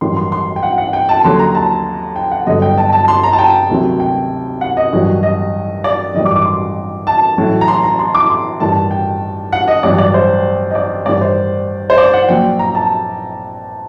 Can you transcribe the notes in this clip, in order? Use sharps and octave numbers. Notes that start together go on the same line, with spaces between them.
A1 G2 D#3 F#3 C6
C6
C6
G5
F#5
F#5
G5
A5
D#2 D3 F#3 C6
A#5
A5
G5
F#5
G1 G2 D3 F#3 D#5
G5
A5
A5
C6
A#5
A5
G5
D2 C3 D#3 F#3
G5
F#5
D#5
A1 G2 D#3 F#3
D#5
D5
A1 G2 D#3 F#3 D#5
D6
D6
C6
A5
A1 A2 F#3
A#5
C6
A#5
C6
D6
C6
A1 G2 D#3 A5
G5
F#5
D#5
A1 G2 F#3 D5
D5
C5
D#5
D5
A1 G2 D#3 D5
C5
C5
D5
F#5
A#1 A#2 F#3 G5
A#5
A5